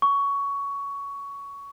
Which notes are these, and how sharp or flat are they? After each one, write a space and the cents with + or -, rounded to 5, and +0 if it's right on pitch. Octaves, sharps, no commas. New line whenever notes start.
C#6 +15